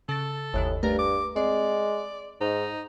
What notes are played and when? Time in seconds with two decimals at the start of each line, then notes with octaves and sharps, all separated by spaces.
0.09 C#3 A4 A6
0.54 G1 D#2 A2 D#3
0.83 G2 A3 A#4
0.99 D6
1.36 G#3 C4 D5
2.41 G#2 D#4